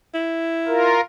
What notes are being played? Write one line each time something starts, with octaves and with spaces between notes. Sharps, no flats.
E4
F4 A#4